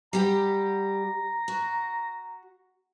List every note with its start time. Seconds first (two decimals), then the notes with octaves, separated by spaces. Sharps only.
0.13 G3 G4 F#5 A#5
1.48 F#4